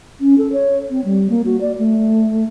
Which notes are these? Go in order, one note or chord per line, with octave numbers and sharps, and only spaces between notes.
C#4
A4
C#5
C4
G3
A#3
F#4
D5
A3